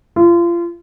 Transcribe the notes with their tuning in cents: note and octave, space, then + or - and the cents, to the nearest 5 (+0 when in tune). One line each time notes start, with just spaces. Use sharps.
F4 -30